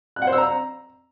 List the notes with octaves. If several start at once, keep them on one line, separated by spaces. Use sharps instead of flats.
F#6
F#5
C5
E6
A#5